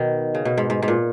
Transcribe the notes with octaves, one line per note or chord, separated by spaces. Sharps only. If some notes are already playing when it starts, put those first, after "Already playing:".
Already playing: B2 D#3
C#3
B2
G#2
G#2
G#2
A#2